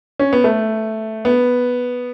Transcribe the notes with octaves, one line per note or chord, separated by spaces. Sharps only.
C#4
B3
A3
B3